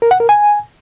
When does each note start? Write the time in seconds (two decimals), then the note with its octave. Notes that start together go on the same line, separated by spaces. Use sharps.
0.02 A#4
0.11 F#5
0.20 A#4
0.29 G#5